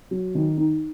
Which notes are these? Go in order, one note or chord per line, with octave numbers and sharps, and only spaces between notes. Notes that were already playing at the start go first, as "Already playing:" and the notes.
F#3
D#3
D#4